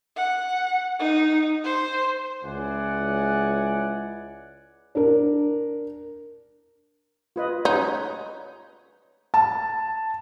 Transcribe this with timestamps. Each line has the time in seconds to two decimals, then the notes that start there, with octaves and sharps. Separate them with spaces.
0.16 F#5
0.99 D#4
1.64 C5
2.43 C#2 G#3 E4 D5 F#5 G#5
4.95 D4 A#4
7.36 F4 B4 D#5
7.65 C#4 D#4 B4 C#5
9.34 A5